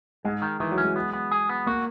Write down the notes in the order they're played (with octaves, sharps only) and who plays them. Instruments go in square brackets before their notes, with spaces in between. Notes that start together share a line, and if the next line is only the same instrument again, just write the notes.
[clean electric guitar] G#2 [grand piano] G#3
[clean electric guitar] D#3
[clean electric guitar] D#3 [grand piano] E3
[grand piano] F#3
[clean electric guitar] C#4
[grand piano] G#3
[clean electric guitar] B3
B3
G#4
B3
[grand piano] A#3 [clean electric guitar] F#4